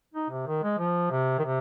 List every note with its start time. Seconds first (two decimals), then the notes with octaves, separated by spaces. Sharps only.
0.14 D#4
0.30 C3
0.47 D#3
0.63 G#3
0.78 F3
1.11 C3
1.39 D#3
1.44 C3